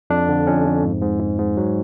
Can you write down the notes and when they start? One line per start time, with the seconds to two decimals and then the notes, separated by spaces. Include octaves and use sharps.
0.10 F2 D4
0.29 D3
0.47 F2 C#4
0.65 F2
0.83 G#2
1.02 G#2
1.20 G#2
1.39 G#2
1.57 F#3